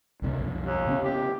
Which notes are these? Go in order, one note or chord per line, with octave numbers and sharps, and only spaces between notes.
C#2 C3 A#3
B1 F2
D#2
C#3 B3 C#4
G4